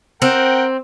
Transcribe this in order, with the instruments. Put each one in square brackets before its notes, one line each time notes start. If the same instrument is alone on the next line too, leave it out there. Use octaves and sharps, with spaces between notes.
[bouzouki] C4 [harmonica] A#4 F#5 G5